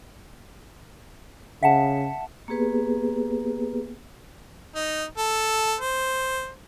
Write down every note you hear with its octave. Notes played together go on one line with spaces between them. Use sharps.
C#3 E5 F#5 A5
A#3 B3 G4 G#4 B4
D#4
A4
C5